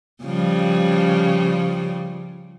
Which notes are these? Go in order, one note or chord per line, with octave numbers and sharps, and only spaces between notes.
C#3 F3 G3